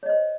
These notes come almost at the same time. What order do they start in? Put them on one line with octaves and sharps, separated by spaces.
C#5 D#5 C5